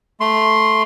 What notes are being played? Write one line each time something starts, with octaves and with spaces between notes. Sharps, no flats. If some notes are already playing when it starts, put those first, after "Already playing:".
A3 C6